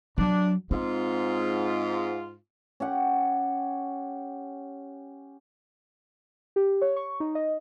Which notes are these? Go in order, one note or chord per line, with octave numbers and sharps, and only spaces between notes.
F#3 D4
G#2 C4 F4
C#4 G4 F#5
G4
C#5
C#6
D#4
D#5